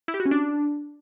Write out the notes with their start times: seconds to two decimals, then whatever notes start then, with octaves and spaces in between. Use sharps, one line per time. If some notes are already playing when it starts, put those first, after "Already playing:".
0.08 E4
0.14 G4
0.20 F#4
0.26 C#4
0.31 D4